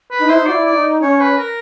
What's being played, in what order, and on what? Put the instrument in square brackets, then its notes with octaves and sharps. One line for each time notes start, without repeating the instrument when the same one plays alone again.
[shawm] B4
[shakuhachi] D#4
[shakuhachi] E4 [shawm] C5
[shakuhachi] D#4
[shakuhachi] F#4 [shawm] D5
[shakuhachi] E4
[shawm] D5
[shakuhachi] D#4
[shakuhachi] C#4 [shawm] C#5
[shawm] B4
A#4